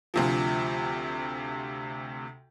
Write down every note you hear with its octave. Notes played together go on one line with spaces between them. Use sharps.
D2 C3 F3